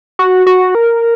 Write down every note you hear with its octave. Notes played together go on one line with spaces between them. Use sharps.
F#4
F#4
A#4